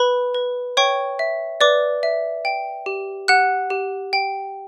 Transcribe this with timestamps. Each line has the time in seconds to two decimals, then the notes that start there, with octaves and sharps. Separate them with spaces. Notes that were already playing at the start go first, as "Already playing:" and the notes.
Already playing: B4 B5
0.34 B4
0.77 C#5 G5 C#6
1.19 E5
1.61 B4 D5 D6
2.03 E5
2.45 G5
2.86 G4
3.28 G4 F#5 F#6
3.70 G4
4.13 G5